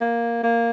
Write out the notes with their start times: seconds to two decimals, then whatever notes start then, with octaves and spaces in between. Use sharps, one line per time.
0.01 A#3
0.43 A#3